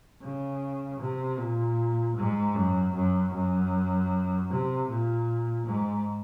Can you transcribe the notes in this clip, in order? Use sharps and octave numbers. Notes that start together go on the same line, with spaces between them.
C#3
C3
A#2
G#2
F#2
F#2
F#2
C3
A#2
G#2